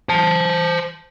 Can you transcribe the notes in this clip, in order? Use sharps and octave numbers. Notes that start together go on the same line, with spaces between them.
C5 A5